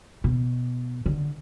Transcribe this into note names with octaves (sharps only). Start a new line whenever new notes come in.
B2
D3